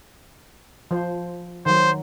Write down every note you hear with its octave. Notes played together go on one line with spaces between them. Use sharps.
F3 C5
D#3 F#3 C5